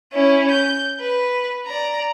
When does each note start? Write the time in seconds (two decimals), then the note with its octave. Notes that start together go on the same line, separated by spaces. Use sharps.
0.13 C#4 E4
0.51 G6
1.00 B4
1.67 D5 A#5